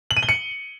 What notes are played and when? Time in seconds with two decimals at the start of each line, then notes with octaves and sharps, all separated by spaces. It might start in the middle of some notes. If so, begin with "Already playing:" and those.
0.11 F#7
0.17 D#7
0.23 G7
0.29 C#7